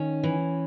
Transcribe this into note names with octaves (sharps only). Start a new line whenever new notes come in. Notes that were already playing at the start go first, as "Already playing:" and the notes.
Already playing: D#3 C#4
E3